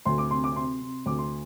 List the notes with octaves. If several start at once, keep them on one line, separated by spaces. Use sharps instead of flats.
D2 C6
D6
C3 C6
D6
C3 C6
C3
D2 D6
C6